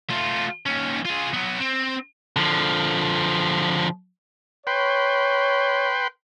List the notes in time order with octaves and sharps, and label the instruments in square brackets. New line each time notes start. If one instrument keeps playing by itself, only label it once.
[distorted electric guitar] A3 F4
D#2 C#4
F4 G#4
F#3 B3
C4
[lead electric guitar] D3 F3
[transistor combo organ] B4 G5 C6 [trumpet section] C#5